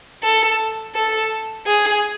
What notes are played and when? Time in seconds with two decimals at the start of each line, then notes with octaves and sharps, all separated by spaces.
0.23 A4
0.95 A4
1.67 G#4